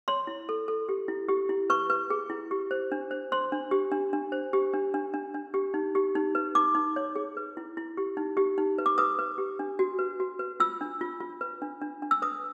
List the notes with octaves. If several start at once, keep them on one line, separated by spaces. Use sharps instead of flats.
C#5 C6
E4
A4
A4
G4
E4
G4
E4
B4 C#6
B4
G#4
E4
G4
C5
D4
C5
C5 C6
D4
G4
D4
D4
C5
G4
D4
D4
D4
D4
G4
D#4
G4
D#4
B4
D#4 D6
D#4
C#5
G#4
B4
E4
E4
G4
D#4
G4
D#4
B4
D6
B4 D#6
B4
G4
D4
F#4
B4
F#4
B4
F4 E6
D4
F4
F4
B4
D4
D4
D4
E6
B4 D#6